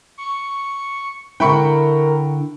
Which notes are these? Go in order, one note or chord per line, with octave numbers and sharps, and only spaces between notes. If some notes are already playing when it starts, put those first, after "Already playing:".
C#6
D3 E4 A#4 G5 B5 C#6